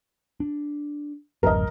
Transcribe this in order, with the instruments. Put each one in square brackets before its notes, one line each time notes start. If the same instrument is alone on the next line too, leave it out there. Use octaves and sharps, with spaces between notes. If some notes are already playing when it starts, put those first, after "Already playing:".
[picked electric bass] D4
[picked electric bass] D1 A1 F#2 [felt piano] A#4 D#5